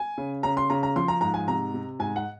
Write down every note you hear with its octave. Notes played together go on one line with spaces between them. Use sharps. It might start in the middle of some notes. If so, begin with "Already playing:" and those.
Already playing: G#5
C#3
C#3 A#5
C6
C#3 A#5
A#5
F3 C6
A#5
G#2 A#5
G#5
C3 A#5
C3
G#2 G#5
F#5